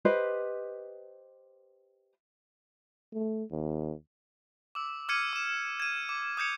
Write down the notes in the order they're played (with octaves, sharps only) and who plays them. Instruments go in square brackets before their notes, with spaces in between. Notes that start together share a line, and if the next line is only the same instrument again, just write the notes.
[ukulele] G4 B4 C5 D#5
[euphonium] A3
D#2
[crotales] D6 E6
D6 F6 G#6 C#7 D#7
D6 E7
G#6 D#7
D6
D#6 G6 G#6 C#7